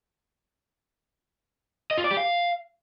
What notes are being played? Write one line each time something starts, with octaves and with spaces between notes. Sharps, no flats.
D#5
F4
D5
G4
F5